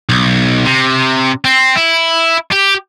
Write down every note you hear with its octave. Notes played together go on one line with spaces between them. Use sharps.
B1
C3
C4
E4
G4